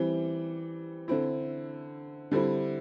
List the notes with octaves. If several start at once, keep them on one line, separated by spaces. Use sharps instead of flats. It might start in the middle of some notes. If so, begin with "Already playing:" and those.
Already playing: E3 G3 C4
D3 C4 E4
D3 G3 C4 E4